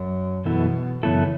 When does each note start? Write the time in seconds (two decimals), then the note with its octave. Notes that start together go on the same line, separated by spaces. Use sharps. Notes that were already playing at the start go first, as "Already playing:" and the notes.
Already playing: F#2
0.45 F#2 B2 E3 B3 E4 A4
1.03 F#2 C#3 E3 B3 E4 A4